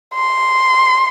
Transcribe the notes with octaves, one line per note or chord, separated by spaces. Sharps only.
C6